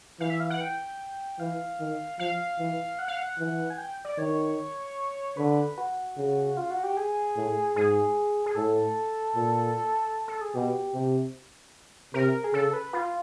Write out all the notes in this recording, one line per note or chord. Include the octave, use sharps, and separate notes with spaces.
E3 F5
E5
F5
F#5
G5
E3 F5
D#3
F3 F5
E3
F#5
F5
F#5
E3
G#5
G5
D5
D#3 C#5
D3 B4
F#4
C#3
F4
F#4
G4
G#4
A2
G#2 G#4
G#4
A2 A4
A#2
A4
G#4
B2 G4
C3
C3 A#4
G#4
C#3 A4
B4
F4